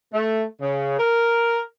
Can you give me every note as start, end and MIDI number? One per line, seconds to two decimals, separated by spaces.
0.14 0.42 57
0.60 0.97 49
0.99 1.60 70